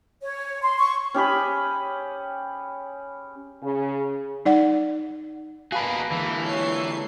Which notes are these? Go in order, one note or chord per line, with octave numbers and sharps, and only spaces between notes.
C#5
C6
C#6
C#4 G4 G#4 B5
C#3
D#4 D5 F#5
A#3 F#4 G#4 B4 F5 A5 B5
D3 E3 G#3 A#3
A4 C#5 C7